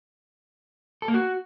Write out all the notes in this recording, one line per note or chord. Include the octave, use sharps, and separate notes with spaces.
A4
A#3
F#4